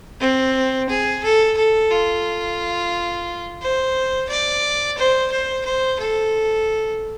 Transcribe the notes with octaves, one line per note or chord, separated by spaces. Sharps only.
C4
G#4
A4
A4
F4
C5
D5
C5
C5
C5
A4